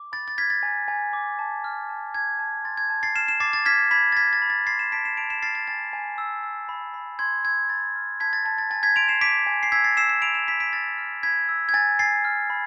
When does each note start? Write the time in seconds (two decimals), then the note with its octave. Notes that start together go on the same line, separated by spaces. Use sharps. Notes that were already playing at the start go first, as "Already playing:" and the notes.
Already playing: D6
0.12 B5 A6
0.28 A6
0.38 F6 G#6 B6
0.50 A6
0.63 G#5
0.88 G#5
1.13 D6
1.39 A5
1.64 F6
1.90 A5
2.14 A5 G#6
2.39 A5
2.64 C6 A6
2.77 G#6
2.90 A5
3.03 A6 C7
3.15 F6 C7 E7
3.28 C7 E7
3.40 D6 A6 C7
3.53 A6
3.66 F6 G#6 B6
3.91 B5 G#6 B6
4.12 A6
4.16 F6 G#6 B6
4.33 A6
4.42 B5
4.50 A6
4.66 C6 A6 C7
4.79 C7 E7
4.92 A5 B6 D7
5.05 C7 E7
5.17 A5 D7 F7
5.30 C7 E7
5.42 F6 A6 C7
5.55 A6
5.67 G#5 A6
5.93 G#5
6.18 E6
6.43 E6
6.69 B5
6.94 B5
7.19 C6 G#6
7.44 E6 G#6
7.69 B5 A6
7.96 F6
8.20 A5 G#6 B6
8.33 A6
8.45 A5 A6
8.58 A6
8.70 G#5 A6
8.83 G#6 B6
8.96 C6 D7 F7
9.08 C7 E7
9.21 D6 B6 D7
9.46 G#5
9.63 C7
9.72 E6 G#6 B6
9.84 A6 C7
9.97 E6 C7 E7
10.09 C7 E7
10.22 B5 D7 F7
10.35 C7 E7
10.47 B5 B6 D7
10.60 B6 D7
10.73 F6 A6
10.98 F6
11.23 B5 G#6 B6
11.49 E6
11.69 G#6
11.74 G#5 A6
11.99 G#5 A6 C7
12.24 F6
12.50 B5